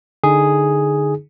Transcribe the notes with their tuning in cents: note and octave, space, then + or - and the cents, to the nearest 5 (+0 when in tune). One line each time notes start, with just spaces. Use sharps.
D3 +0 D#4 +0 G#4 +0